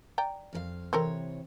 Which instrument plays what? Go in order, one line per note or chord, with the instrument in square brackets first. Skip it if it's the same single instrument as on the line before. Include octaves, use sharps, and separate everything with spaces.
[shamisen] D5 G5 A#5
[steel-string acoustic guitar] F2 A4 F5
[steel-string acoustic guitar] C3 E3 C#5 [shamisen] C4 A4 A#4